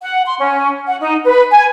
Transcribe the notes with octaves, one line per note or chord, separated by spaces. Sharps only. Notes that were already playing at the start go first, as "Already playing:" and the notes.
F#5
C6
C#4
F#5
D#4
B4
G#5